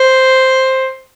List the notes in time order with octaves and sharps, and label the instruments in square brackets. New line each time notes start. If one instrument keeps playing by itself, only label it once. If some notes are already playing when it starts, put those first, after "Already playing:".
Already playing: [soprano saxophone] C5